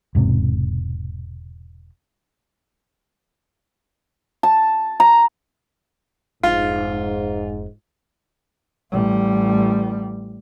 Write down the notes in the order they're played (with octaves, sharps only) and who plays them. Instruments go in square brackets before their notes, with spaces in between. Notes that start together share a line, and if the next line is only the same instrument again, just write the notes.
[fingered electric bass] E1 G#2 C3
[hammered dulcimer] A5
A#5
[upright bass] F1 D4 [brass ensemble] G#2 [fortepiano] F4
[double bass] A1 G3